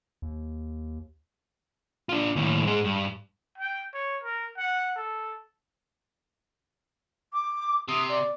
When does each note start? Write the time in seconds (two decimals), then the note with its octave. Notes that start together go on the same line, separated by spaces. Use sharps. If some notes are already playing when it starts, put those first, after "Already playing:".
0.22 D#2
2.09 D4 F4
2.36 D#2 A2
2.65 G#2 G#3
2.84 G2
3.58 G5
3.94 C#5
4.24 A#4
4.57 F#5
4.96 A4
7.33 D6
7.88 C3 D#6
8.09 D5